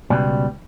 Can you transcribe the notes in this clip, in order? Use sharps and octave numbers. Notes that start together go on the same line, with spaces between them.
C#2 B2 G3